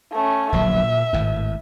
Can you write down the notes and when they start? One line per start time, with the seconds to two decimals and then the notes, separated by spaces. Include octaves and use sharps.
0.12 A3 C#4
0.52 D1 A#1 F#3 E5
0.83 A#2
1.13 G#1 A2